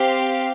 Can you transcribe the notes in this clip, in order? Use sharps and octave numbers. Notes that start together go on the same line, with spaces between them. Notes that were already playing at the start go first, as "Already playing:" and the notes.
Already playing: C4 G4 C5 F5